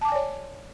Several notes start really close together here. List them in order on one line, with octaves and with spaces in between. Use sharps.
A5 D6 G#5 D5 C#5